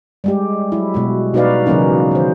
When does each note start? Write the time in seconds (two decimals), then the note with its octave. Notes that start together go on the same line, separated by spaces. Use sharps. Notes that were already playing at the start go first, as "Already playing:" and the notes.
0.24 G3 G#3 G4
0.72 F#3 E4
0.94 B2 G#3 F#4
1.34 B2 D#4 F#4 B4 D5 F5
1.66 C#3 E3 F#3 A#3 C#4 D#4
2.11 D#3 C5